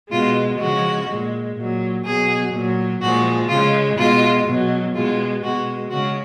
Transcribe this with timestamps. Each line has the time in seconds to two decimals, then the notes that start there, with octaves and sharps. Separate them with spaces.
0.11 B2 G#3 F4
0.59 C#3 F3 G#3 F#4
1.07 A#2 G#3
1.55 A#2 F#3
2.04 B2 F#3 G#4
2.52 A#2 F#3
3.00 A#2 F3 G#3 F#4
3.48 C#3 G#3 F4
3.97 B2 G#3 F4
4.46 B2 F#3
4.94 B2 G#3 F4
5.43 B2 G#3 F#4
5.90 C#3 G#3 F#4